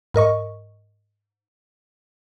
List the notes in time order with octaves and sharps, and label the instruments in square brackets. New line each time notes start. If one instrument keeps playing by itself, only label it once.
[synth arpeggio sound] G#2 A#4 D#5 C#6